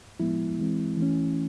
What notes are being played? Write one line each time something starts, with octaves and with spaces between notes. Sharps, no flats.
A2 F3 G#3 B3 E4
E3 G#3 C4
E3 A3 C#4